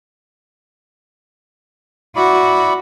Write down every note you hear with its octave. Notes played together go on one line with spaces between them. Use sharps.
E4 F#4 D5 B5